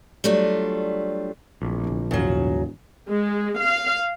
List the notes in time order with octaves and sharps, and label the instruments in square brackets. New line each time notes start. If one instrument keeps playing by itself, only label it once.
[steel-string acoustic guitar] F#3 G3 A3 D4 F4
[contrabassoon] D1 [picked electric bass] A#1
[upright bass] D3 E4
[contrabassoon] E1 [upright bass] D#2 G#2 [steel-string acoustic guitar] C#3 F#3
[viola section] G#3
F5